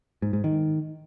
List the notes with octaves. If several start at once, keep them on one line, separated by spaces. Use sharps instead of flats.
G#2
G#2
D#3